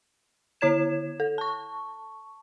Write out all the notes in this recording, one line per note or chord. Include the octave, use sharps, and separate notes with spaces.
D3 E4 C#5 G#6 E7
A4
A5 C#6